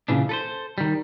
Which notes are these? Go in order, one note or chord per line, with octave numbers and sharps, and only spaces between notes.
A#2 C#3 E3 D4
A4 B4 C5
D#3 G3